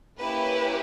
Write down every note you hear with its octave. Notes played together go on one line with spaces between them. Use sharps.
A#3 C#4 E4 G4 B4